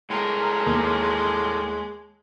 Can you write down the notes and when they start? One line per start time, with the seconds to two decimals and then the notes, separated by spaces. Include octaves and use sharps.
0.10 A2 G#3 A#4
0.66 D#2